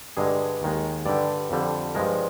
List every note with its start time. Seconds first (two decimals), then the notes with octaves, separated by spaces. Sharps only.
0.17 G2 D3 G#3 G#4
0.62 D#2 D#3 G#3
1.06 G2 D3 G3 D5
1.51 F2 D3 G3
1.95 G2 F3 G#3 A#4